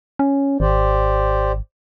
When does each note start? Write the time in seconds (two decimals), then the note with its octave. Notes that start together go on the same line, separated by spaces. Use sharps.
0.19 C#4
0.60 G#1 G4 C5 D5